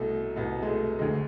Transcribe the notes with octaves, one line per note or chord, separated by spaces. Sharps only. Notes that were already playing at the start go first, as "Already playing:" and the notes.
Already playing: C2 B2 A3
C2 B2 B3
G#3
A3
D2 D3 G#3